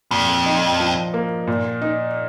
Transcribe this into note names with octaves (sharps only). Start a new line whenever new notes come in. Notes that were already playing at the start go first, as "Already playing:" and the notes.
F2 A#2
D#4
F3
A#3
A#2
D#4